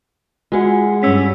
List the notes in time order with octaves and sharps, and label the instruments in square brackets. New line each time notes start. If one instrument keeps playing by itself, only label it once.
[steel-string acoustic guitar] G#3 G#4 F#5 [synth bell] F4 F#4
[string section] G2 [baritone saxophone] C#4 [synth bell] E6 B6